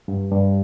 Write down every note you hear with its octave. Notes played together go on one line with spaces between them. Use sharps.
G2
G2